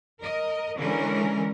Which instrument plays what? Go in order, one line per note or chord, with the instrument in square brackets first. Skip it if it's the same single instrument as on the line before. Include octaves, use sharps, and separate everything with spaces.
[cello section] A#4 D#5
D3 E3 G#3 C#4 A#4